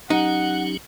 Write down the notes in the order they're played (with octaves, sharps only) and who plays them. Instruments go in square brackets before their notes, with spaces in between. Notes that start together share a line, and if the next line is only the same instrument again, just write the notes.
[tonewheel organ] F#3 C#4 G4 [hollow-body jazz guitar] D#4 [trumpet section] F#5